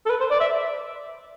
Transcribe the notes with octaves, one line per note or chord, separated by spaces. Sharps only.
A4
B4
C5
D5
E5